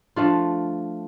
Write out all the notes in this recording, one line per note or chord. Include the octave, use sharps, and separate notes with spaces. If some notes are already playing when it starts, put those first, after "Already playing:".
F3 A3 D4 F4